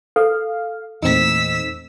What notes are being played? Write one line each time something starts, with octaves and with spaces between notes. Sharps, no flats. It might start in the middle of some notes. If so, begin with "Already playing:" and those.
A4 F5
E2 A#2 A3 C4 D#4 E6 B6